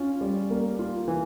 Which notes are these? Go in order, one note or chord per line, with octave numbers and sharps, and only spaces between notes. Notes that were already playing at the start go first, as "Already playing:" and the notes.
Already playing: C#4 F4
G3
A#3
F4
E3